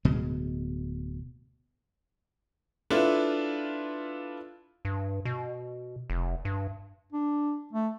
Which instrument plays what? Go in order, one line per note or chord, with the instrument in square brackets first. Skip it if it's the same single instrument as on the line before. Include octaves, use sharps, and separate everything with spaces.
[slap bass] D1 B2 G#3
[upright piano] D4 E4 F4 A4 B4
[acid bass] G2
B2
F1
G2
[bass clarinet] D4
A3